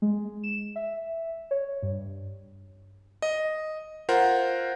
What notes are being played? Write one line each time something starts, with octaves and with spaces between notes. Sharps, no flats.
G#3
E7
E5
C#5
G2
D#5
F4 A#4 C5 F#5